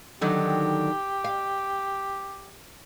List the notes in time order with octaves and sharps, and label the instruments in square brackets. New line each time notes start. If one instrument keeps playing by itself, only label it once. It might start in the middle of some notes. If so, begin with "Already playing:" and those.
[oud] D3 D#3 F#3 [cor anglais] G4
[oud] F5